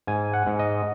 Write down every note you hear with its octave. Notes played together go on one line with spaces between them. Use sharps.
G#2 G#5
F#5
G#2
D#5